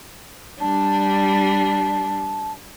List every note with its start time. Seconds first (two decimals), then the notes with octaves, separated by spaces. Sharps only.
0.60 G3 D4 A5